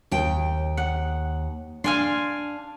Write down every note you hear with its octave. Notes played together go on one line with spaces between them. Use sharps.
D#2 G5
F#5
D4 F5 G#5 C6